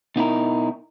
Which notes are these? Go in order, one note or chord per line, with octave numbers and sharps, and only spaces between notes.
B2 D#4 E4 A#4